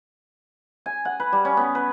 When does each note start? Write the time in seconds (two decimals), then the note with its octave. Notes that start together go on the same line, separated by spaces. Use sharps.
0.86 G#5
1.05 F#5
1.20 B4
1.33 G3
1.45 C#4
1.57 B3
1.75 B4